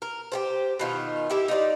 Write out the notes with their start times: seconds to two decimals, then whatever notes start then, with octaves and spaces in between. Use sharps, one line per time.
0.02 A#4
0.32 G4 A4 C5
0.79 B2 D#3 F4
1.30 E4 G4 E5
1.48 D#4 F4 B4 D5